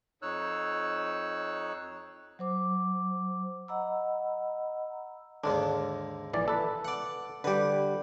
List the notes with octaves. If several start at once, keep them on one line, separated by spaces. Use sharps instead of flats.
F2 D#4 C#5 E6 F#6
F#3 C5 D6
D#5 F#5 A#5 B5 E6
D#2 G#2 D3 D4
A#1 E3 D5
A4 B4
D5 F#5
D3 G3 G4 B4